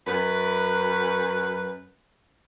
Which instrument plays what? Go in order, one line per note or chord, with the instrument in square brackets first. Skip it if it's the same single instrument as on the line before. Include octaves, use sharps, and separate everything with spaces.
[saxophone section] F#2 B4